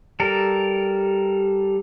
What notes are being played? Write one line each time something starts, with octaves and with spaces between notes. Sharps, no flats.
G3 A4 A#4